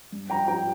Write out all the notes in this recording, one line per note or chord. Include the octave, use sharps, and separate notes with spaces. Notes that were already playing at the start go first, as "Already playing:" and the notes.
G2
F3 G5 A#5
F3 G5 A#5